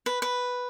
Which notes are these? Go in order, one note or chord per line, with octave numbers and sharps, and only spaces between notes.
B4
B4